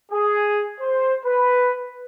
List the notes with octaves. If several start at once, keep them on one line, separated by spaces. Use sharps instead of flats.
G#4
C5
B4